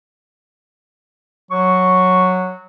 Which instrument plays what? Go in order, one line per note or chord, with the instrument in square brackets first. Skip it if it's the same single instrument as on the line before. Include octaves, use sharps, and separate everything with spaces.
[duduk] F#3 [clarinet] C#6